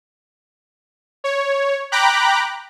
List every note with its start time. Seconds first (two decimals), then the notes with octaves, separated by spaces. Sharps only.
1.24 C#5
1.92 G5 A#5 B5 D6 F#6